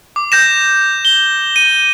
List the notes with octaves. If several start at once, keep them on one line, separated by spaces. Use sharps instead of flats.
D6
G6 A#6 E7
G7
D#7